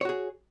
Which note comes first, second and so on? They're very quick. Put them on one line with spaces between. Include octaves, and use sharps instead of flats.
C#5 F#4 G#4